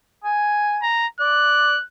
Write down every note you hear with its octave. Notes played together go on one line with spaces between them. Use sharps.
G#5
A#5
D5 F#6